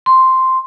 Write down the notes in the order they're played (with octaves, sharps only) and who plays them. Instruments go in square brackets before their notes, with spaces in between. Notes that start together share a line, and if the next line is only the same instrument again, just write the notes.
[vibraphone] C6